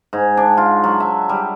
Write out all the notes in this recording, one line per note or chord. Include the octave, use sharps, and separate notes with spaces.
G#2
D4
F4
F#3
E5
G3